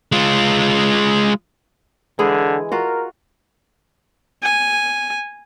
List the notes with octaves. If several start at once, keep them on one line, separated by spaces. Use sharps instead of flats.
G#3 F4
D3 E3 G#3 G#4
F4 F#4 A#4
G#5